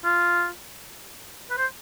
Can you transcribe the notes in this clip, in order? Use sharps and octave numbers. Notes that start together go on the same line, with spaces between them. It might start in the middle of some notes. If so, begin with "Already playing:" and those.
F4
B4
C5